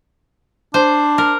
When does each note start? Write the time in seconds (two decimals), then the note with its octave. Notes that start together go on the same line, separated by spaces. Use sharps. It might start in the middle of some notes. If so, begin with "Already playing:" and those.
0.74 D4 C5
1.18 A#4